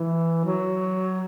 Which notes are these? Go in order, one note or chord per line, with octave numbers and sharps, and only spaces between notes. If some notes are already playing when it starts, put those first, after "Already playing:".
Already playing: E3
F#3